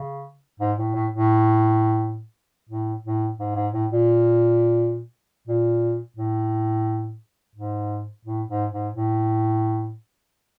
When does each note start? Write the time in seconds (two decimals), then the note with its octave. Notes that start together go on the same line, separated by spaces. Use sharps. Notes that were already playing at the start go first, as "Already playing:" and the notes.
Already playing: C#3
0.60 G#2
0.78 A2
0.95 A2
1.12 A2
2.69 A2
3.04 A2
3.39 G#2
3.55 G#2
3.73 A2
3.91 A#2
5.48 A#2
6.17 A2
7.55 G#2
8.25 A2
8.49 G#2
8.72 G#2
8.95 A2